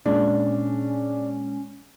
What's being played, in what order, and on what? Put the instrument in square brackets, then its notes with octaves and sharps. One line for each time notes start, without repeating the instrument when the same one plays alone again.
[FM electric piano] A#2 G#3 [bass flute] C#4 [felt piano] D4